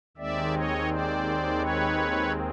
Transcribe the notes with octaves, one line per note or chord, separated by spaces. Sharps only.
D#2 D#3 G#3 C4 D5 E5
C#5 D#5
C5 D5
B4 C#5